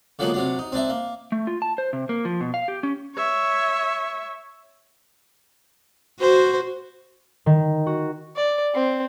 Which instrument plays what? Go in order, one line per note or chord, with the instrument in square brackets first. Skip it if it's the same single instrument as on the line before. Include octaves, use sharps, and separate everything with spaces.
[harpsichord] D3 F3 F#3 G#3 A#3 B3
C3 F#3 D4
D#4
C4 D4 D#4 E5
A#3
[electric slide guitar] A3
F4
A5
C5
C3
A#3
F3
B2
F5
G4
C#4
[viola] C#5 E5
[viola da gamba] F#4 [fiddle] C5
[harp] D#3
F#4
[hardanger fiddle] D5
C4